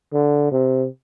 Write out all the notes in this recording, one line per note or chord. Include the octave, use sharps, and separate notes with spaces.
D3
C3